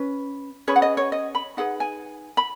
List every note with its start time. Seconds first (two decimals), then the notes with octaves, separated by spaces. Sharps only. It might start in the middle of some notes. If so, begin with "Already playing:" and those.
Already playing: C#4 B4
0.67 C#4 G#4 B4 C#5
0.76 F#5
0.82 D#5
0.97 C#5
1.12 D#5
1.35 B5
1.57 D#4 G#4 B4 F#5
1.80 G#5
2.37 B5